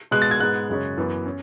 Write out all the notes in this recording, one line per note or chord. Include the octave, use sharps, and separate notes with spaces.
B2 G#3 B3 F#6
A6
G#6
G#2 G#3 B3 F#6
F#2 C#3 G#3 C#4
F#2 E3 B3
C#4